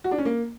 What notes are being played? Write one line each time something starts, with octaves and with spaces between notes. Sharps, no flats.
F#4
D4
C#4
A#3